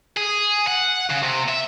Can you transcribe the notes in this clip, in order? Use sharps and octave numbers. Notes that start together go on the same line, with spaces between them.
G#4
F#5
C#3
C3
E5